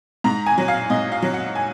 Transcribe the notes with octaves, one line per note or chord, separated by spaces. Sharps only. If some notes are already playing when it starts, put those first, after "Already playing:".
G#2 A#5
G#5
F#3
F5
G#2 D#5
F5
F#3
F#5
G#5